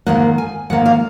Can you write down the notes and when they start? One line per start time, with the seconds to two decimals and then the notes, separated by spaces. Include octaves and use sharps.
0.06 G#2 D#3 A#3 F#5
0.38 G#5
0.70 G#2 D#3 A#3 F#5
0.86 F5